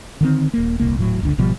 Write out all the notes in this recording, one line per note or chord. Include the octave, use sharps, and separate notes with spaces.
D3 D#3 C4
D#1 A#3
D#1 C2 A#3
D#1 A2 F#3
F#1 C#2 D3
G#1 B2 F3 G3